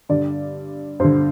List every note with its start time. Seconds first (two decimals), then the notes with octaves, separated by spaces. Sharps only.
0.09 G2 D3 D5
1.00 G2 D3 C5